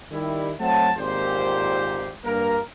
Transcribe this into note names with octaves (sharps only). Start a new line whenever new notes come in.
D#3 G3 E4
F#3 A3 C4 F#5 A5
G#1 A#2 G4 C5
G2 A#3 A#4